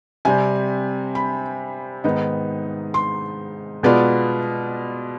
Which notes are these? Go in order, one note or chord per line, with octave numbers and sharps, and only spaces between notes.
C3 G3 C4 G#5
B5
G#2 D#3 B3 D#4
C6
B2 G#3 B3 F4 D5